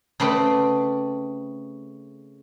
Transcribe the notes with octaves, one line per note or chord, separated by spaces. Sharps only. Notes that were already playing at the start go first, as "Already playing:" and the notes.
C#3 A3 C4 B4 D5